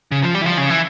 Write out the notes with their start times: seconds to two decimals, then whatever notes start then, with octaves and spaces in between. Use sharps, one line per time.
0.12 C#3
0.23 F3
0.35 G3
0.42 E3
0.46 F3
0.57 C#3
0.70 E3